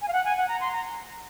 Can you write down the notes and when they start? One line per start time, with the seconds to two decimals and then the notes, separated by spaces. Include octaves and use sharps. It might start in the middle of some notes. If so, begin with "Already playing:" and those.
0.02 G#5
0.08 F5
0.13 F#5
0.25 G#5
0.37 F#5
0.48 A#5
0.61 C6
0.72 A#5